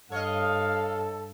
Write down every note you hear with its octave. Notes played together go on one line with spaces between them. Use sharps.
G2 A4 C#5 D#5 F5